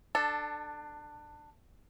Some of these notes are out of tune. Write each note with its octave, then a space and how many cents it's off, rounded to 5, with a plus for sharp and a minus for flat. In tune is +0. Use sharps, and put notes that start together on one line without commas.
D4 +20 A4 +0